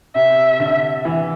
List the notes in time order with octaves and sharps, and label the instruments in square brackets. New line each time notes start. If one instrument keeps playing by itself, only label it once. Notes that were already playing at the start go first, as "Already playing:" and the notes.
[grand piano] C3 [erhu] E5
[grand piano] D3
E3